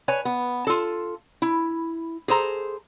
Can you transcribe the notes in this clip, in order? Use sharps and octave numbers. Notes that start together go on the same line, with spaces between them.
B4 C#5 G#5
B3
F4 A4
E4
G#4 A4 C5 A#5